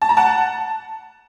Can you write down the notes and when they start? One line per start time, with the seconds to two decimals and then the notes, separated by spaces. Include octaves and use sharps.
0.02 A5
0.09 A#5
0.17 F#5 A5